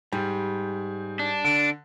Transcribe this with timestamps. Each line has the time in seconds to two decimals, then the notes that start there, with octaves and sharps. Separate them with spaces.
0.13 G#2 G3
1.19 D4
1.44 D3 D7